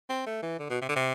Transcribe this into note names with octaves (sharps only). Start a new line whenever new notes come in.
C4
A3
E3
D3
B2
C3
D3
C3